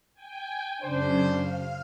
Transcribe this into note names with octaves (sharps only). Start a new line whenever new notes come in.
G5 G#5
F#2 C#3 D4 C5
F5